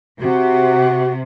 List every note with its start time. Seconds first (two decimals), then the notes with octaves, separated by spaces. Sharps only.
0.21 C3 F#4